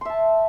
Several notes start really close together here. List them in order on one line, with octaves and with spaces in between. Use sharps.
C6 E5 A5